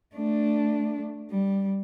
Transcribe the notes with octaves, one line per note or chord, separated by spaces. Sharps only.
A3 D4
G3